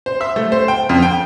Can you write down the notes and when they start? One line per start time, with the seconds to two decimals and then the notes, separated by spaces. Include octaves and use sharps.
0.06 C5
0.21 E5
0.36 A3
0.52 C5
0.68 G5
0.89 F2
1.02 G5